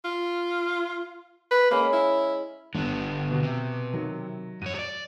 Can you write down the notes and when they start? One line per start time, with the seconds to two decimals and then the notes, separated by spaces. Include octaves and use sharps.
0.05 F4
1.51 B4
1.71 G#3 A#3 C#4 B5
1.93 E4
2.75 G1 D3 B3
3.31 B2
3.43 C3
3.93 D#3 F#3
4.62 F#2 C#5 D#7
4.75 C#5 D5